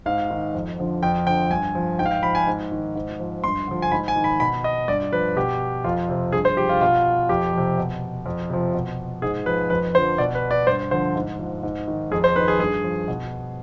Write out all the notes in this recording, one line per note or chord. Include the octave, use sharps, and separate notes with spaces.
G#2 F5
D#3
F2
D3 F3
F2 G5
D3 F3 G5
G2 G#5
F3
G#2 G5
F5
G5
F3 B5
G#5
G#2
D#3
G#2
F3
G2 C6
D3 F3
G#5
G#2 B5
G#5
D#3
B5
B2 B5
D#5
G2 D5
F3 B4
B2 G4
F2 F4
C3 F3
G2 G#4
C5
F3 G4
F4
B2 F4
F2 G4
C3 F3
B2
F2
C3 F3
B2
G#2 G#4
F3 B4
F2 B4
D3 F3 C5
B2 D5
B4
D5
G2 C5
D3 F3 C5
G#2
F3
G#2
D#3
F2 G#4
C5
D#3 B4
G#4
G2 G#4
F3
B2